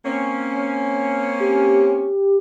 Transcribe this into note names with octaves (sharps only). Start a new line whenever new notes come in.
A#3 C4 C#4
G4